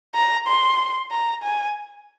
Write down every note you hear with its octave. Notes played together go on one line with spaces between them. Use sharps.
A#5
C6
A#5
G#5